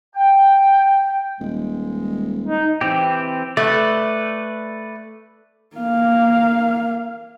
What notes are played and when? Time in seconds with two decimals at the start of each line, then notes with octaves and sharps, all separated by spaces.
0.15 G5
1.40 D#1 G#3
2.48 D#4
2.81 E3 C4 G4
3.57 A3 B4 D5
5.76 A#3 F5